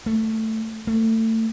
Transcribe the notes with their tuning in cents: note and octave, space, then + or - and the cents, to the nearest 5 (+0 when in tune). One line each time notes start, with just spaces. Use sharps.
A3 +5
A3 +30